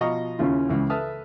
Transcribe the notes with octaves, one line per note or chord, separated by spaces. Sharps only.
B2 F3 D#5 F5 A#5 C#6
D#2 C#3 C#4 E4 F4
C#2 C#3 E3
A4 B4 E5 A5 D#6 F6